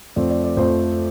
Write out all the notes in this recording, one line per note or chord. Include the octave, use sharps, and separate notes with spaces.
F2 F3 A3 C4 D5
D5
D5
F2 F3 A3 C4 C5